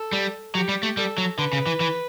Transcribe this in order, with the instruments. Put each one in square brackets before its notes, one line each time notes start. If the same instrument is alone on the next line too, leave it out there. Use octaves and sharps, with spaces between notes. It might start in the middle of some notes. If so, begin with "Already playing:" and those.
Already playing: [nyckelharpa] A4
[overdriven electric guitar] G3
[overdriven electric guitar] F#3 [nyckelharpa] G4
[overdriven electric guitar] G3
A3
[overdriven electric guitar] G3 [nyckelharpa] A4
[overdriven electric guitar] F#3
[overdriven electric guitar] D3 [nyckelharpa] B4
[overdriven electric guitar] C#3
E3
E3